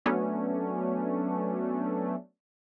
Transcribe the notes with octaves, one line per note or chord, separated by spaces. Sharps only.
F#3 A3 B3 C#4 D4